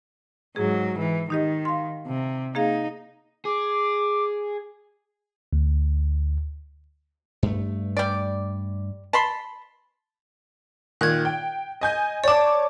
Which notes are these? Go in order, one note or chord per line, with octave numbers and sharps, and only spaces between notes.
G#2 F#3 G#4
E3
D#3 D#4 G4 D#5
F5 C6
C3
A#3 D#4 G#4 F5
G#4 D6
D2
G2 A3
G3 D5
A5 B5 C6
A#2 D#3 F#6 G#6
G5
D#5 G#5 G6
C#5 D5 A5 D6